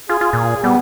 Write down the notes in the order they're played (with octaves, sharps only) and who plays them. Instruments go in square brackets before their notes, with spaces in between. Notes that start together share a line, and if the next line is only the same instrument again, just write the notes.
[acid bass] F4 [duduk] G#4
[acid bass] F4
A#2
[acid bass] G3 [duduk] B3